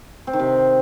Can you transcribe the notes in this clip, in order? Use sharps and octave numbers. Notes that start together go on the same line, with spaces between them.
C4
D#3
C3